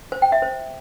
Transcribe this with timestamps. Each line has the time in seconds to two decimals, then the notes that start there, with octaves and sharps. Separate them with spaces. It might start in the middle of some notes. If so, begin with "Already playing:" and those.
0.12 C5
0.22 G5
0.32 E5
0.42 C5